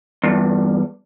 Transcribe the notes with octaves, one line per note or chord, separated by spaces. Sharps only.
E2 G2